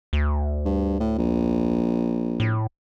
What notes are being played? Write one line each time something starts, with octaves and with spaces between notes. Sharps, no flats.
D2
G2
A2
A#1
A2